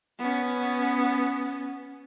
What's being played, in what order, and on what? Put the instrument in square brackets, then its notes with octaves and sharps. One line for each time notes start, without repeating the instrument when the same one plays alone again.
[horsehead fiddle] B3 C#4